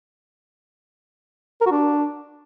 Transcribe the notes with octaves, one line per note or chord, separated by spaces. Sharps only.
A#4
F#4
D4